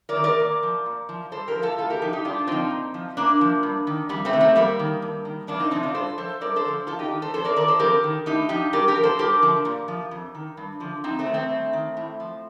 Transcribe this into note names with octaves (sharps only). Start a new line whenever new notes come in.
A#4 D5
D#3
A#4 D5
A#2
F3
A#2
F3
G2 A4 C5
G4 A#4
F3
F4 A4
A2 F4 A4
G4 A#4
F3 D#4 G4
D#4 G4
G2 D4 F4
D3 F3 C4 D#4
A#2
F3
A#2 A#3 D4
F3
G2
D#3
F2 G3
A3 C4
C3 D#3
A3 C4
F2 G3 A#3
D#3
G2
D#3
F2 A#3 D4
C4 D#4
C3 F3 C4 D#4
D4 F4
G2 A4 C5
F3 A4 C5
G2 A#4 D5
A4 C5
D3 F3
F2 F4 A4
D#4 G4
D#3
A4 C5
F2 A4 C5
A#4 D5
D#3 A#4 D5
A4 C5
F2 G4 A#4
D#3
A2 D#4 G4
F3 D#4 G4
G2 G4 A#4
G4 A#4
F3
A4 C5
G2 G4 A#4
D3 F3
A#2
F3
F2
D#3
G2
D3 F3
F2 C4 D#4
A3 C4
C3 D#3
A3 C4
G2
D#3
A2
F3